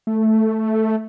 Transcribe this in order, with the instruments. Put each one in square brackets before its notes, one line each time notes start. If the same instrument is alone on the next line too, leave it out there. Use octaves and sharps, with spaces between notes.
[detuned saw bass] A3